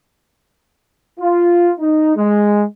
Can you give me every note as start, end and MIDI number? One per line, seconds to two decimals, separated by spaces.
1.18 1.70 65
1.79 2.14 63
2.16 2.64 56